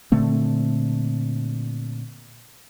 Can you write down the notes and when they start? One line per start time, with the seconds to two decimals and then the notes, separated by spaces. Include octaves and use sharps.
0.12 A#2 D3 A3 C4